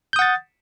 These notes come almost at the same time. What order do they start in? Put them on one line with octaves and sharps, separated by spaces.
G6 D#6 F#5 A6